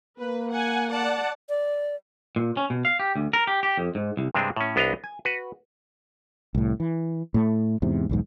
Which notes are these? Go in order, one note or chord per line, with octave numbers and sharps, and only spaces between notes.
A#3 B4
F#5 G#5
D5 F#5 A5
D5
A#2
C#4
B2
F5
G4
D2
A#4
G4
G4
F2
G#2
C2
G2 C3 G#3 C4 D4
A2 C#4
C2 B3 D4 D#5 F5 A#5
G#5
F#4 B4
C2 A2
E3
A2 A3
E2 G#2 C3
B1 E2 G#2